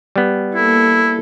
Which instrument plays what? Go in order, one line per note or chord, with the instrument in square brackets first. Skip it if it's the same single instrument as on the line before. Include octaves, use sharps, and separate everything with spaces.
[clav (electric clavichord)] G3 B3
[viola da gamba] A#3 A4 [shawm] E4